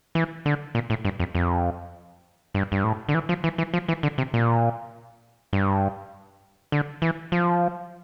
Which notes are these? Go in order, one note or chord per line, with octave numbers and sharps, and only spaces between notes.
E3
D3
A#2
A2
G2
F2
F2
G2
G2
A2
D3
E3
F3
E3
E3
F3
E3
D3
C3
A#2
G2
D3
E3
F3